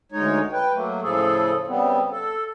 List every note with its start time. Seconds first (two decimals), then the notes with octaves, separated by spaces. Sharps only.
0.12 D2 G#3 D#4 C#5
0.52 B4 G5
0.74 F#3 A3 A#3
1.02 A2 C#3 F3 G#4 A4
1.67 C#3 G3 B3 C4
2.11 A4